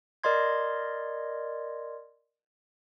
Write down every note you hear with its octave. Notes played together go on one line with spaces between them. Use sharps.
A#4 D5 D#5 C6 G#6